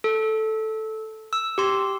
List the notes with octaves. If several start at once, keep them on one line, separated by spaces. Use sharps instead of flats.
A4
E6
G4 C6